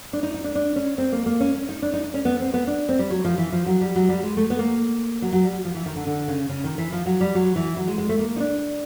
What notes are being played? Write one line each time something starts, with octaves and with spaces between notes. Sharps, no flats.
D4
D#4
D#4
D4
D4
C#4
C4
A#3
A#3
C#4
C#4
D#4
D4
D#4
D4
C#4
B3
C4
B3
D4
C4
G3
F#3
F3
E3
F3
F#3
G3
F#3
G3
G#3
A3
B3
A#3
F#3
F#3
G3
F3
E3
D#3
D3
D3
C#3
C#3
D#3
E3
F3
F#3
G3
F#3
E3
F#3
G#3
G#3
A3
A#3
D#4
D4